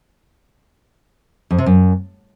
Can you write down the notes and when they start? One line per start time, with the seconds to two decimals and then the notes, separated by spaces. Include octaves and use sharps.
1.51 F2
1.58 C3
1.66 F#2